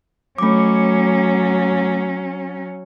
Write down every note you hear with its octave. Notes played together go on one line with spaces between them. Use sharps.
F#3 A3 C#4 D6